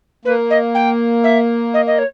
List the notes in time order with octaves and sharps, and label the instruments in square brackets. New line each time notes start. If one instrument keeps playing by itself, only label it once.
[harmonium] A#3 [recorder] B4
[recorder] D#5
G5
E5
D#5
D#5
C#5